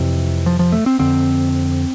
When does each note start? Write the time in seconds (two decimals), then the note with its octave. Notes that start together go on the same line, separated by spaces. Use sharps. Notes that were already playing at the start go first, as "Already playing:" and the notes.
Already playing: F2 C3 E3
0.46 F3
0.59 F3
0.72 A3
0.86 C4
0.99 F2 D3 C4